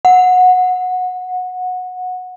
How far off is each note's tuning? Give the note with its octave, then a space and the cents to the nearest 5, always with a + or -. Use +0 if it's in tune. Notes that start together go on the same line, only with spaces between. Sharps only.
F#5 -15